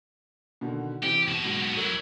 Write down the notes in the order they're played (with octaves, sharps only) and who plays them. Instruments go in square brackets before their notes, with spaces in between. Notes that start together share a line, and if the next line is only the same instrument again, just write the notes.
[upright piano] B2 D3 D#3
[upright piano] C3 E3 [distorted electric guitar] G4
[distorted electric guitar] B2 A5
[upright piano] G#2 F#3
[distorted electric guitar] F#3 E4 [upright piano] A#4